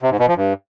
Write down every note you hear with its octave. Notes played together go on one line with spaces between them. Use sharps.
C3
G#2
B2
F3
G2